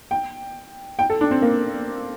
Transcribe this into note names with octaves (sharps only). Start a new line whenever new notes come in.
G5
G5
A4
D4
C4
A#3